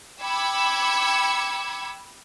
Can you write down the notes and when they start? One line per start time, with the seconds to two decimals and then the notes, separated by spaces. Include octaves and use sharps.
0.22 G5 B5 D6 E6 G#6 C#7